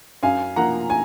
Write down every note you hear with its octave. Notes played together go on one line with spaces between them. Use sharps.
F#2 F5 G#5
F3 A#3 F#5 A#5
G#5